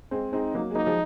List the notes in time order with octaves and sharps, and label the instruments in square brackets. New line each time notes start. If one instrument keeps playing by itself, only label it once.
[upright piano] G#3 C4
[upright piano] G#3 C4 [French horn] D#4
[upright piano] F#3 A#3
G#3
[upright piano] F#3 A#3 [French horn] D#4
[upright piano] F3 G#3